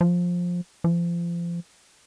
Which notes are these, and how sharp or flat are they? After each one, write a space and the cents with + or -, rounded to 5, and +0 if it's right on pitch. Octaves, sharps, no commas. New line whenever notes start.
F3 +15
F3 -30